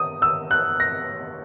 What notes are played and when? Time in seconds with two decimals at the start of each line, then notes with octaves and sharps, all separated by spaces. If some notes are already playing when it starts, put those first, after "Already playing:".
Already playing: D#6
0.22 E6
0.51 F#6
0.80 A#6